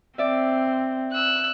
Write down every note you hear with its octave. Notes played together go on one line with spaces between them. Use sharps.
C4 D5 E5
E6 F#6